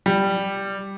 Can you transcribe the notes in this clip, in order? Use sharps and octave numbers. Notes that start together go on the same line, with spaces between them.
G3